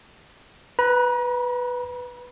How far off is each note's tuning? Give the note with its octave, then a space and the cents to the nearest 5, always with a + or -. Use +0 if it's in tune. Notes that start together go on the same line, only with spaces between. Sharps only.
B4 +0 A#5 +45